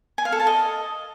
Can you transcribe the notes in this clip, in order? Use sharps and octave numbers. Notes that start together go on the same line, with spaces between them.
G#5
F5
A4
A5
D#5